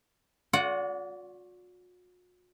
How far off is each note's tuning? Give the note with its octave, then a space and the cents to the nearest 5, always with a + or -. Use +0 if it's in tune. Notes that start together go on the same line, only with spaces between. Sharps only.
F#4 -45 D5 -30 F#5 +0